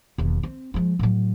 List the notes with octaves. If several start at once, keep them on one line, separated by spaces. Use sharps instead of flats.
E1 D#2
C4
F3 G#3
A2 F#3